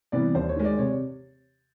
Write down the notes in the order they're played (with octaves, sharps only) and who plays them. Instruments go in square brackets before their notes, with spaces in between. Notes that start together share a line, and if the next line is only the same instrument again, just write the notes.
[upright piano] C3 E3 G3 B3 D5
D#2 C5
C#5
D#3 G#3
D5
C3 C#5